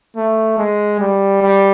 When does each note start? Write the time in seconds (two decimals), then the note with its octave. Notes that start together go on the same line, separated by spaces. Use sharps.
0.17 A3
0.58 G#3
1.00 G3
1.42 G3